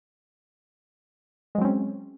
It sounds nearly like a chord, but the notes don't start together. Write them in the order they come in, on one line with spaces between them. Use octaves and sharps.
G#3 F#3 C4 C#4